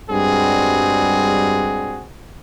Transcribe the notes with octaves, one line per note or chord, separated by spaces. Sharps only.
G2 G3 G#3 C4 F#4 G#4